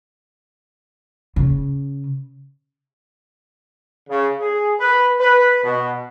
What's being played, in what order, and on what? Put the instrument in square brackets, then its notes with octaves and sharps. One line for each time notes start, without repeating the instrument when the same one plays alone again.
[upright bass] C#3
[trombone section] C#3
G#4
B4
B4
B2